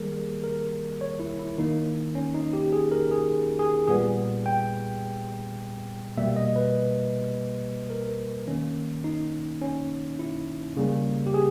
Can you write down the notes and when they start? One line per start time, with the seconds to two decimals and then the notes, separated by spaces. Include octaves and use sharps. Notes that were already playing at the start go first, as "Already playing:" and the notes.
Already playing: D#3 G3 A#3 G#4 A#4
0.44 A#4
1.01 C#5
1.20 E4
1.39 E4
1.58 D#3 A#3 D#4
2.15 C#4
2.34 D#4
2.53 G4
2.73 G#4
2.91 A#4
3.11 G#4
3.59 G#4
3.87 A#2 G3 B3 G#4
4.46 G5
6.17 B2 G3 A#3 E5
6.36 D#5
6.56 B4
7.90 A#4
8.47 D#3 A#3 C#4
9.04 D#4
9.62 C#4
10.19 E4
10.77 C#3 G3 A#3
11.27 G4
11.34 G#4